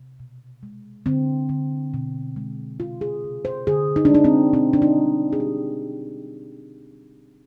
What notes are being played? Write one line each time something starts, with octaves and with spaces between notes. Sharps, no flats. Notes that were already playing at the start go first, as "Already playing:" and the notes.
Already playing: C3
B2
G#3
D3 C4
D3
B2
G#3
C3 F4
G#4
C3
C5
D3 G#4
D#4
D4
G#3 D#4
C4
B2 C4
D4
D#4
G3
G#4
B2 G4